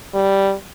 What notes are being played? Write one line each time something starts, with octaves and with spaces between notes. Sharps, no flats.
G3